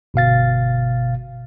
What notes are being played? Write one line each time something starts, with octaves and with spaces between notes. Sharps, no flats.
G1 B2 F5 A6